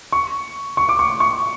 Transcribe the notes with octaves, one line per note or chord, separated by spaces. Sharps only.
C#6
C#6
D6
C#6
C#6